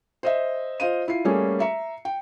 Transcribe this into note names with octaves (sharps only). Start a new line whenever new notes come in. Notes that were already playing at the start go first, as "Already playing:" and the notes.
C5 D#5 E5
F4 C5 D#5 F5 D#7
E4 F4 C7
G3 A3 A#3 C#4 G#4
E5 A#5 C#7
G5